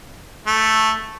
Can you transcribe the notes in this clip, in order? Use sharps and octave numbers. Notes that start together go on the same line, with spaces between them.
A3